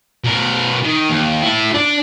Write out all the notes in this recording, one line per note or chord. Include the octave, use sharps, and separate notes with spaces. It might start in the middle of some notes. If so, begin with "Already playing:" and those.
B2 A#4
D#3
D#2
E4 A4
D4